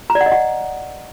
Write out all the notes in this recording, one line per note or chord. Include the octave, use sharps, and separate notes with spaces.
A#5
D5
F#5
D#5
F#5